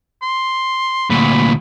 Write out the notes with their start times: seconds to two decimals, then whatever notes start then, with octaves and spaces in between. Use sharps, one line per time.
0.22 C6
1.10 D2 A#2 B5